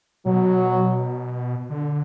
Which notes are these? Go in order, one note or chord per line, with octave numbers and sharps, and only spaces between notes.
B2 F#3
D3